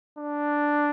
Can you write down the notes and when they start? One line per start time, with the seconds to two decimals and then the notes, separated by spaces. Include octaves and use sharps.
0.18 D4